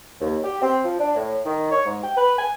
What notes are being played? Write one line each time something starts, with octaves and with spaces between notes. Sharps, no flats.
D#2
G4
C4
F3
D4
A2
D#3
C#5
G#2
G5
B4
G#5